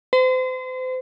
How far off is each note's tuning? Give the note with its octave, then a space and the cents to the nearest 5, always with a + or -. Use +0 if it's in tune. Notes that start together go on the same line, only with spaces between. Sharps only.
C5 -35